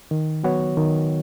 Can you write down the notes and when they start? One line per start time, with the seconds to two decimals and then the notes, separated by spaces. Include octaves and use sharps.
0.11 D#3
0.44 F#3 B3 F#4 C#5
0.77 D#3